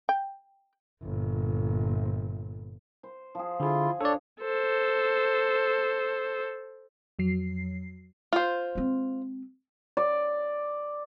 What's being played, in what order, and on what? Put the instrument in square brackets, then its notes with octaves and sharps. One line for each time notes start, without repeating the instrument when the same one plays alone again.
[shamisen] G5
[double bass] G1 A#2
[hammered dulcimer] C5
F3 G#4
[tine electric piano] D3 G#4 [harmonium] E4 F4 [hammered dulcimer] G#5
[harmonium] D4 C#5 [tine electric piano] A4 D5
[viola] A4 C5
[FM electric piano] F2 F#3 C7
[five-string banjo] F4 C5
[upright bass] G#3 C4
[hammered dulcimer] D5